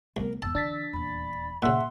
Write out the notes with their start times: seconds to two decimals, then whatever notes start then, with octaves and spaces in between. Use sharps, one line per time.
0.17 C2 A3 B3 A#4
0.42 E2 G2 A5 E6
0.55 D3 E3 D4 A6 B6
0.93 D#1 E2 B5
1.62 G2 A#2 C#3 C#4 E5 F#5 C6